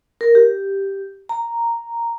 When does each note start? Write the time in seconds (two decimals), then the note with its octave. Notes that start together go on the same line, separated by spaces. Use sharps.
0.21 A#4
0.35 G4
1.29 A#5